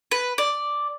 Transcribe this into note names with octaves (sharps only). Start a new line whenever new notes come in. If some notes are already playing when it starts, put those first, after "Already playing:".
B4
D5